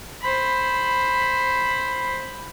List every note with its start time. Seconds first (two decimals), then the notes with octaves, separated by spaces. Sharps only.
0.22 C5 B5